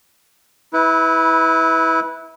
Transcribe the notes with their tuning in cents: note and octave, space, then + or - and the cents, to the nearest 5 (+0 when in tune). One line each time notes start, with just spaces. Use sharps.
E4 -25 B4 +0